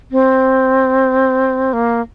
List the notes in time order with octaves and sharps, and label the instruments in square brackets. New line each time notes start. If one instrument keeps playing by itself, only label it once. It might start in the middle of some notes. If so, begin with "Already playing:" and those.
[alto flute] C4
A#3